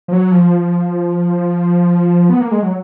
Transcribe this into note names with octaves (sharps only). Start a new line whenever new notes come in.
F3
F#3
F3
B3
A#3
G#3
F#3